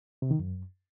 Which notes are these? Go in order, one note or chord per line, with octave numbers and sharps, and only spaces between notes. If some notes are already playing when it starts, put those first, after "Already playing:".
C3
D#3
F#2